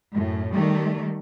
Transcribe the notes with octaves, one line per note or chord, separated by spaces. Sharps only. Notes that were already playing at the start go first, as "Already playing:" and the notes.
F#2 A2
D#3 G3 A3